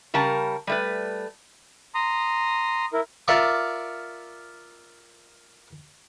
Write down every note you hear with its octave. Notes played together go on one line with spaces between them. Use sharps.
C#3 G3 A#4 A5
G3 A3 B4
A#5 C6 D#6
E4 A#4
F4 A#4 D5 E5 C#6 D6